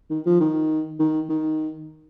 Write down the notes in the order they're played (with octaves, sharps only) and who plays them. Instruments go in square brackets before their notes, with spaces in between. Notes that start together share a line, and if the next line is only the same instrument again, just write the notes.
[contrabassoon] D#3
F3
D#3
D#3
D#3